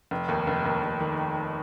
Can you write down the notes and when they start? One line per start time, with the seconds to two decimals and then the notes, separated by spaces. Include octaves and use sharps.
0.11 F1
0.28 D#2
0.47 F1
0.65 D#2
0.82 F1
1.00 D#3